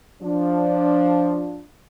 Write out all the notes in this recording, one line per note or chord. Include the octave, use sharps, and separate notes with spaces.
F3 D4